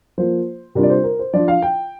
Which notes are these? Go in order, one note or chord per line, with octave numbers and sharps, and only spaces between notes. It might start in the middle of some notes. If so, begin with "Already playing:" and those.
F3 A#3 F4 C5
C3 G3 D4 F4 A#4
D5
C5
A#4
C5
F3 D4 F4 D5
F5
G5